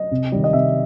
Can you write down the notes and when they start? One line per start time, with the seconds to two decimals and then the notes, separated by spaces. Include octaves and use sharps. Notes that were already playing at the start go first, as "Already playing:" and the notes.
Already playing: D#5
0.11 C3
0.32 D#3 G3
0.44 D#5
0.53 C3 E5